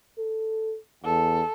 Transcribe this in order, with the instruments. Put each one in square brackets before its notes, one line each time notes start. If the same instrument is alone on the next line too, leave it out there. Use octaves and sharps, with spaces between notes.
[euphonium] A4
[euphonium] E2 [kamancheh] A4